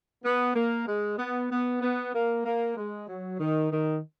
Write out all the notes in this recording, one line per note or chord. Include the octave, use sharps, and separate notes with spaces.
B3
A#3
G#3
B3
B3
B3
A#3
A#3
G#3
F#3
D#3
D#3